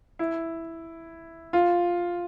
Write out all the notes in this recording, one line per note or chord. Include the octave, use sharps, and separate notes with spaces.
E4
F4